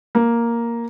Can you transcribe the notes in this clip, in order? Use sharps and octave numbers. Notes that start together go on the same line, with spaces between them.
A#3